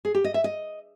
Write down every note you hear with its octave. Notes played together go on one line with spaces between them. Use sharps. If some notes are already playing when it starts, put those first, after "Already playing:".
G#4
G4
D#5
E5
D#5